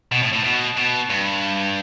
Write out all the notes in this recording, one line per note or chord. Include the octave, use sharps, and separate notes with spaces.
B2
A2
A2
B2
B2
G2